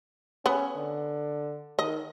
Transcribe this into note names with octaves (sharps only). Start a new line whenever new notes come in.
B3 C#4
D3
D#3 D#5